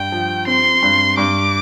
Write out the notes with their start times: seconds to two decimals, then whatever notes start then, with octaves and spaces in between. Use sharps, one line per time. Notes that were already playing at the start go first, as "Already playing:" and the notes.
Already playing: G2 G5
0.12 F3
0.47 C4 C6
0.83 G2
1.17 G2 D6